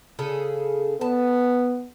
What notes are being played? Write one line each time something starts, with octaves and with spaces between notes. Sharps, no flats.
C#3 G#4 A4
B3 A5